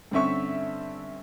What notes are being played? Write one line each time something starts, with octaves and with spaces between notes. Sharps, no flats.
G2 D3 C4 C#4 E5 C#6